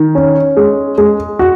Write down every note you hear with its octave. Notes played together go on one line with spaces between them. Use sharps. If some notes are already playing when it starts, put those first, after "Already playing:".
Already playing: D#3
C#4
G#3
G#3
F#4